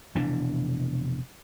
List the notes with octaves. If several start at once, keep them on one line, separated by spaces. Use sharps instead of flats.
F1 B2 E3 D4